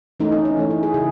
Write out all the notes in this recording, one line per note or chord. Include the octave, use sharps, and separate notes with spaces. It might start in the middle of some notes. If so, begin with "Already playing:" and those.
E3 A3 C#4 D#4
C#4
C#4
E3 A3 C#4
E4
G#4
C#3 G#4